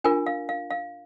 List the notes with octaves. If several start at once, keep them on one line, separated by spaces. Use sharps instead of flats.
D4 F4 A#4 G#5
F5
F5
F5